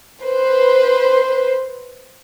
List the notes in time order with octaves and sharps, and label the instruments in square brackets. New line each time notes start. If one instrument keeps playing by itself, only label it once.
[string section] B4 C5